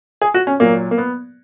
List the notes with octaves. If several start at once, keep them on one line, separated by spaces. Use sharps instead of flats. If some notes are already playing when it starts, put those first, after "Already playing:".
G#4
F#4
C#4
A#2 F#3 A#3
A#3
B3